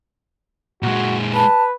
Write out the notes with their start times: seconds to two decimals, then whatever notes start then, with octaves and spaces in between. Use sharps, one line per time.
0.83 A#2 G#3 F#4
1.34 B4 A5